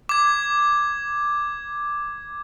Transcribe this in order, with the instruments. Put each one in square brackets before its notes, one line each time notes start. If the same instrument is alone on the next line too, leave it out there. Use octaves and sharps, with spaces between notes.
[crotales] D6 G#6